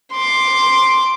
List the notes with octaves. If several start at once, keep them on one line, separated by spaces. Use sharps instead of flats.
C6 D6